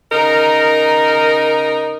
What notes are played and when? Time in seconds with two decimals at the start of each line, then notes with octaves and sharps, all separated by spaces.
0.11 C#3 D#4 A#4